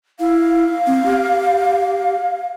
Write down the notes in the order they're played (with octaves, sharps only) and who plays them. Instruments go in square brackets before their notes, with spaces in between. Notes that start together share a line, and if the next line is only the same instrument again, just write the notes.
[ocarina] E4 [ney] F5
[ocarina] C4
G4